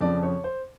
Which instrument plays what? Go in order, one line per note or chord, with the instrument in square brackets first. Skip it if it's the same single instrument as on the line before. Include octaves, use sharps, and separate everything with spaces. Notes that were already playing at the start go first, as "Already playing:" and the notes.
[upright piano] F2 C#3 F3 D5
C#5
C5